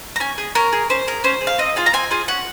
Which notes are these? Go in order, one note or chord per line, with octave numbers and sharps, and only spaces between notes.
A#5
C#4 G#5
G#4
C#4 A#4
G#4
C#4 C5
G#4 A#4
C#4 C5
G#4
F5
C4 D#5
F4 G#4 F5
A#5
C4 G#5
F4 G#4
C#4 F#5